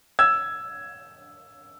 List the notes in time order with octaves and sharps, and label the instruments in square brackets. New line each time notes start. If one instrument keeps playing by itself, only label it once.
[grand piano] E6 G#6